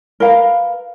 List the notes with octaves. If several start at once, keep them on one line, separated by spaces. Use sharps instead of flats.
A#4 B4 F5